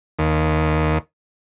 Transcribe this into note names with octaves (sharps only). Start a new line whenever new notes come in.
D#2